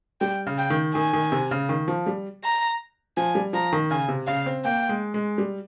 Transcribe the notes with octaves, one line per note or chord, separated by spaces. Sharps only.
G3 G5
C#3
G5
D#3
D#3 G#5
D#3
C3
C#3
D#3
F3
G3
A#5
F3 G#5
G3
F3 A#5
D#3
C#3 G#5
C3
C#3 F5
C4
A#3 G5
G#3
G#3
G3